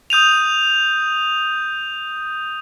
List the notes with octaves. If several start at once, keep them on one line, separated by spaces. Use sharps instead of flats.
D#6 G6 D#7 F7